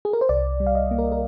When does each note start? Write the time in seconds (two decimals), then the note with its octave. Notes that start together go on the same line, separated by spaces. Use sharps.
0.05 G#4
0.13 A#4
0.21 C5
0.29 C2 D5
0.60 G3
0.67 F5
0.75 D#5
0.91 A#3
0.98 A#4
1.12 A#4